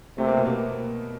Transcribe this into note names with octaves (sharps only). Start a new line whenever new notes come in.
C3 A3
A#3
B2 B3
A#3